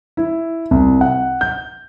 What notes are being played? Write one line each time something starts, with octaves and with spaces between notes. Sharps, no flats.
E4
C2
F#5
G6